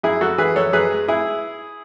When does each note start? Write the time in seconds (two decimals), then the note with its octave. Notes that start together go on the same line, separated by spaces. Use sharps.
0.03 F#2 E4 G#4
0.21 F#2 F#4 A4
0.38 E3 G#4 B4
0.56 F#2 A4 C#5
0.73 F#2 G#4 B4
0.91 G#3
1.08 E4 G#4